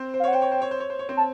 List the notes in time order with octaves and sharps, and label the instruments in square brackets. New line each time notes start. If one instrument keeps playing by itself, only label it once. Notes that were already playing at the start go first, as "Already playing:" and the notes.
Already playing: [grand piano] C4 C5
C5
[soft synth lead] F5
[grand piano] C#5 [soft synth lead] F#5
[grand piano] C5 [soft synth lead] G5
[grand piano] C#5
C5
C#5
C5
C#5
C5
C#5
C4 C5
[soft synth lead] A5